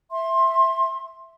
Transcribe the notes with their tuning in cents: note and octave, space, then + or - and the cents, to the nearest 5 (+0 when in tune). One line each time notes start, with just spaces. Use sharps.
E5 +0 C6 +20